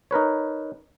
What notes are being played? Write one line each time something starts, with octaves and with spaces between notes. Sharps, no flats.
D#4 A#4 B4 C#5